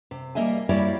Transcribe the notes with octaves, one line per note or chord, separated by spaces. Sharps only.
C3
G3 A#3 D#5 E5 G#5
G3 A#3 E4 G4 C#5 D5